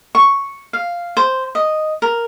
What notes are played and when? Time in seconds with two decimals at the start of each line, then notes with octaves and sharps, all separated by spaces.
0.15 C#6
0.73 F5
1.17 C5
1.55 D#5
2.02 A#4